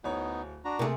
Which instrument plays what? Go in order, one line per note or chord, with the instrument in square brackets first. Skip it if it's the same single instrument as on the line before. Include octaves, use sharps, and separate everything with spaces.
[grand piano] D1 C#5 [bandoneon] B3 D#4
[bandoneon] D4 F#4 A#5
[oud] C3 G#4 [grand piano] A3 A#3